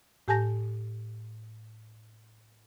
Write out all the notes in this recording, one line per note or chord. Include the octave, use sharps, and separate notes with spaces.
A2 G4 G#5 A5 G6 A#6